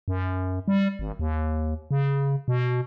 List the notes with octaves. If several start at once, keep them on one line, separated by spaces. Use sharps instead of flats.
F#2
G3
G#1
D#2
C#3
B2